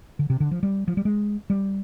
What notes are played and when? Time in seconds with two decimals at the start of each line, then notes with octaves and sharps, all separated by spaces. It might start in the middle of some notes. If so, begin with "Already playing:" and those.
0.19 D3
0.30 C3
0.40 D3
0.51 F3
0.63 G3
0.88 F3
0.97 G3
1.05 G#3
1.50 G3